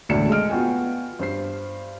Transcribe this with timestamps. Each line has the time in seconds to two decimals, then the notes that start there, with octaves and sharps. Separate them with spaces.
0.09 E1 D2 A2 D5 C#7 E7
0.29 G#3 A3 D#5 F6 D7
0.50 B3 F4 F#4 G5 G#5
1.19 G2 C5 C7